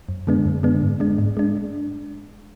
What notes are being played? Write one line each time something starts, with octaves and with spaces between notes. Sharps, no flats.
F#2
D3 G#3 B3 D4
F#2
D3 G#3 B3 D4
G#2
G#3 D4
G#2
G#3 D4